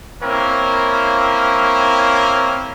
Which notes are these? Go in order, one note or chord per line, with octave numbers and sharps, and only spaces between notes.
A#3 C4 C#4 E4 A#4